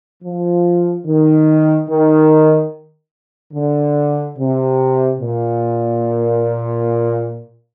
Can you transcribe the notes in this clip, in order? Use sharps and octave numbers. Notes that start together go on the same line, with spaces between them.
F3
D#3
D#3
D3
C3
A#2